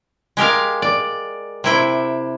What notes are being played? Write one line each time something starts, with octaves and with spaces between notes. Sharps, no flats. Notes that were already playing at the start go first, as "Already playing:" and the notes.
G#3 G4 A#4 F5
D5
C3 E4 G5